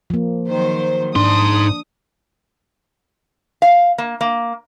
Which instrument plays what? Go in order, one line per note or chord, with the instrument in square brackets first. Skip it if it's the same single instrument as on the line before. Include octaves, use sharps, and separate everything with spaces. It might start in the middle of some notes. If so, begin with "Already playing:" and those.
[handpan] F3 A#3
[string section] D#3 F#3 C5
[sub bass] G#2 [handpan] D4 [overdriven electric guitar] D#4 C6 [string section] D#6
[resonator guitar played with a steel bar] F5
A#3
A#3